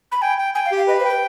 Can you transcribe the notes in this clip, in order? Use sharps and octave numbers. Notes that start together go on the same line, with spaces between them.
B5
G5 G#5
G5
G5 G#5
F5
G4
F5
B4 D#5
C5
G5
B4